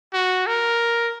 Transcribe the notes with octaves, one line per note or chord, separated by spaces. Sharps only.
F#4
A#4